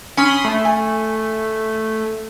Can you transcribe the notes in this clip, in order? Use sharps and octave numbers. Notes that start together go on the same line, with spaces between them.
C#4 B5 C6 D#6
A3
G#5